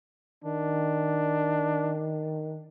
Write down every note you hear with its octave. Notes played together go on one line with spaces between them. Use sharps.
D#3 D4